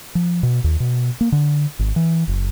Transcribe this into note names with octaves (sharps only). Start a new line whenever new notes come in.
F3
B2
D#2
B2
A#3
D3
G#1
E3
F#1